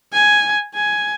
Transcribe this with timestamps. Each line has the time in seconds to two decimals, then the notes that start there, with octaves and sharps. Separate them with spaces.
0.14 G#5
0.75 G#5